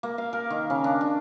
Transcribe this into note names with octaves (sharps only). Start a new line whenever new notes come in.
A#3
F5
A#4
D#3
C#3
D4
D4